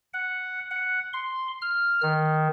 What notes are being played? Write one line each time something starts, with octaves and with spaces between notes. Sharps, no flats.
F#5
F#5
C6
F6
D#3